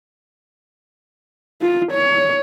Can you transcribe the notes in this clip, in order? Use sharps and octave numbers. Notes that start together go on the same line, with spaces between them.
F4
C#5